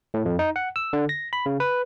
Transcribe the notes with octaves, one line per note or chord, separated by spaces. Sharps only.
A2
F2
D#4
F#5
E6
D3
A#6
B5
C#3
B4